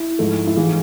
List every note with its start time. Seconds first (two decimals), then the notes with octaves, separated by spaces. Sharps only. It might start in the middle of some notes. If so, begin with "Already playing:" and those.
Already playing: E4
0.19 G#2 F3 A3
0.47 E4
0.56 G#2 E3 G#3 F4